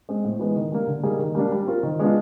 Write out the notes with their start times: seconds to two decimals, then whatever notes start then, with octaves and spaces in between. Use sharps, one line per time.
0.09 G#3 C4
0.25 A2
0.39 E3 G#3 B3
0.56 D#3
0.72 G3 A#3
0.87 D3
1.03 G3 A#3 D#4 G#4
1.19 D#3
1.35 G3 A#3 D4
1.52 G3
1.67 C4 F4 A#4
1.83 D#3
1.99 G#3 B3 D4 F4